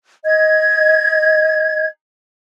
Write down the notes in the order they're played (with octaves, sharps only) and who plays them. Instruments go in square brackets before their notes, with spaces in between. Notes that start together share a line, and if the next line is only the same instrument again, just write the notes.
[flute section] D#5 G#6